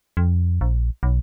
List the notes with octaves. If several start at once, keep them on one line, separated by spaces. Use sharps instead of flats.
F2
A#1
B1